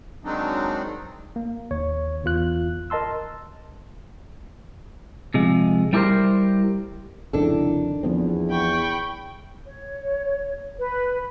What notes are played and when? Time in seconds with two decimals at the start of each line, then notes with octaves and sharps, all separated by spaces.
0.24 D#3 F#3 G#3 C4 D4 D#4
1.36 A#3
1.71 D#2 C#5
2.24 E2 E3 F4 F#6
2.90 A#4 D#5 A5 C6 E6
5.34 C3 F3 G#3
5.93 G3 E4 G4 A4 A#4 C5
7.33 F1 C#2 D#3 D4 E4 A4
8.03 E2 F3 B3 C4
8.51 G5 B5 C#6
9.67 C#5
10.79 B4